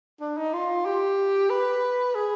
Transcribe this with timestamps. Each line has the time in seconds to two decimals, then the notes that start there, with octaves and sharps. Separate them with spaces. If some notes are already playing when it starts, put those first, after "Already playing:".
0.21 D4
0.38 D#4
0.53 F4
0.86 G4
1.50 B4
2.15 G#4